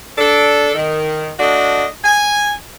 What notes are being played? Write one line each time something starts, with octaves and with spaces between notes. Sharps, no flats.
D4 A4
D#3
A3 D4 F#4 D#5
G#5